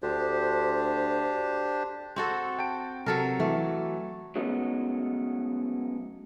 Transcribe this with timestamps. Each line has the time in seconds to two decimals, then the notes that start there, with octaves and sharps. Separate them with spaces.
0.02 D2 D4 G4 C5
2.16 C4 F#4 A4
2.59 G5 A5 D7
3.06 C3 F#3 A4 A#4
3.40 E3 F#3 A3
4.36 F#3 G#3 A3 B3 C#4 D#4